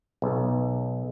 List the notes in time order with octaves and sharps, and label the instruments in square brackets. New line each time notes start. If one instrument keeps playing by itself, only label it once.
[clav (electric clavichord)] B1